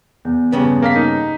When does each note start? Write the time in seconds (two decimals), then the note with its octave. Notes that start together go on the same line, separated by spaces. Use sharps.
0.25 E2
0.52 G2 C#3 B3
0.82 A#3 F5 B6
0.96 D#4